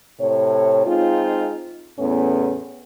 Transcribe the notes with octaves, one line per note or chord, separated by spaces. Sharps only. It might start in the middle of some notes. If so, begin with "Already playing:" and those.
A2 C3 C#5
G#3 C4 D#4 F4
E2 A2 B3 C#4